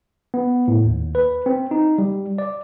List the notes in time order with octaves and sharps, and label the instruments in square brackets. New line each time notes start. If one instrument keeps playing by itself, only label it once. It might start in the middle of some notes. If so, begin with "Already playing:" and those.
[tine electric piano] B3
A2
D#2
B4
C4
D#4
G3
D5